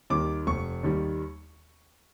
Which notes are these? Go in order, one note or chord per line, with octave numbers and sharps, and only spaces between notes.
D#2 D#3 G3 D6
F1 C#6
D#2 D#3 G3